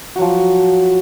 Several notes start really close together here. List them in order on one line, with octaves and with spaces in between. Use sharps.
F#4 F#3 F3